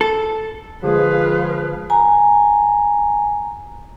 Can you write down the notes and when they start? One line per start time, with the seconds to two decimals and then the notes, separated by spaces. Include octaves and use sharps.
0.01 A4
0.84 D3 F3 G#3 G#4 B4 F5
1.90 G#5 A#5